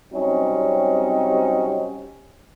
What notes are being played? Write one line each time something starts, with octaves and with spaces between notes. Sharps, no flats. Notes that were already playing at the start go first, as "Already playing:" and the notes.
C3 F#3 G3 C4 C#4 D#4